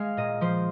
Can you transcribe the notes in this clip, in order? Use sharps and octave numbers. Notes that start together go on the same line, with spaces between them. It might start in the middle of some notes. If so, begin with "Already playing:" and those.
Already playing: G#3 G#4 F5
A#2 D#5
F3 C5